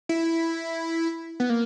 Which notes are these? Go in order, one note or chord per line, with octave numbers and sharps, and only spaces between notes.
E4
B3
A#3